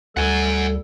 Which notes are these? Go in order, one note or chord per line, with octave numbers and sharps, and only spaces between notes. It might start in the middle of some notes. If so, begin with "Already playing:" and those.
D2 G3 A4 F#5 G#5